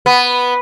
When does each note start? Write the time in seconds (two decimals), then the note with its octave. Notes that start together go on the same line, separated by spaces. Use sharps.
0.06 B3